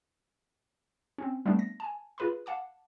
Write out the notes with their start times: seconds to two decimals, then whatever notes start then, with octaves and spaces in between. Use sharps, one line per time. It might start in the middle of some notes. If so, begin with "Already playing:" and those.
1.18 C4 C#4
1.46 G3 A3 B3 C4 D4
1.59 A#6
1.80 G#5 A5
2.18 F4 G#4 B4 B5 C6
2.46 F5 F#5 A5 D6